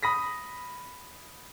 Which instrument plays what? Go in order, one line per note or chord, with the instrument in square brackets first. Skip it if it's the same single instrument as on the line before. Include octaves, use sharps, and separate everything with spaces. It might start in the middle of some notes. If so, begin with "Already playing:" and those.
[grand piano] B5 D#6 A#6 B6